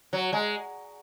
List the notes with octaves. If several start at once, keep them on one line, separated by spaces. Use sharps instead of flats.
F#3
G#3